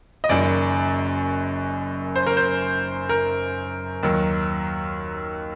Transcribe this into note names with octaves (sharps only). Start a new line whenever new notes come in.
D#5
F#1 F#2 D#3 F#3 D5
C5
A#4
C5
A#4
D#2 D#3 F#3